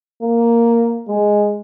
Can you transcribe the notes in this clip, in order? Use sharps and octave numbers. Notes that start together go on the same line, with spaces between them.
A#3
G#3